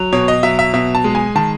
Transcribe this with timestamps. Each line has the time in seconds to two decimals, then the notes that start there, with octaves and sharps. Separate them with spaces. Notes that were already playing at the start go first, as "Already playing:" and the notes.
Already playing: F#3
0.13 B2 C#5
0.28 D#5
0.43 F#3 E5
0.59 E5
0.73 B2 E5
0.95 A5
1.04 G#3
1.15 G#5
1.35 D#3 A5